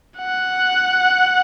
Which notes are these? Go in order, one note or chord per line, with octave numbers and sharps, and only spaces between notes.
F#5